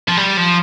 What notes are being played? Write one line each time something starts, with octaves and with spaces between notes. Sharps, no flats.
F3
G3
F3